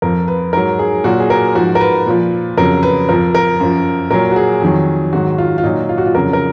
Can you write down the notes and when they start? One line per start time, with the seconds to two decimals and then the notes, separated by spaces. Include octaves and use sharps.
0.02 F2 F3 A#4
0.28 B4
0.53 G#2 F#3 A#4
0.79 G#4
1.04 A#2 F#3 F#4
1.20 G#4
1.30 A#4
1.55 G#2 F3 F#4
1.75 A#4
1.81 B4
2.06 A#2 F3
2.57 F2 C#3 F#3 A#4
2.83 B4
3.09 F2 F3 A#4
3.35 A#4
3.60 F#2 F3
4.10 A#2 F#3 A#4
4.32 F#4
4.36 G#4
4.62 F2 D#3 F#3
5.13 G#2 D#3 F#3 F#4
5.38 F4
5.58 F4
5.64 A#2 F#3 D#4
5.89 F4
5.98 F#4
6.06 F4
6.15 F2 C#3 F#3 A#4
6.33 A#4